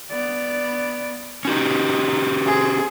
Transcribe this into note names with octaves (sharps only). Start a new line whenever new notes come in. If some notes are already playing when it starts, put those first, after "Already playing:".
B3 D5
C#4 D#4 F#4 G4
C4 G#4